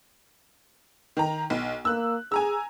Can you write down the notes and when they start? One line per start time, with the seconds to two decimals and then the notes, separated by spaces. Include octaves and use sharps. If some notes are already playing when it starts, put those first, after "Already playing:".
1.17 D#3 A#5
1.50 B1
1.85 A#3 E6 F#6
2.32 G#4 G#5 A#5 E6